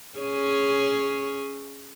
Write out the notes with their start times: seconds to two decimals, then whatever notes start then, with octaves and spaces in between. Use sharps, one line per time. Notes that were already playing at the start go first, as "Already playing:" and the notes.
0.18 C#4 G#4 C#5